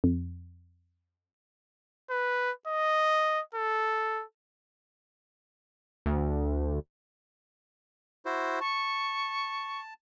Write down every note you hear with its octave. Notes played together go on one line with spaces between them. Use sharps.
F2
B4
D#5
A4
D2
E4 F#4 C5
A5 C#6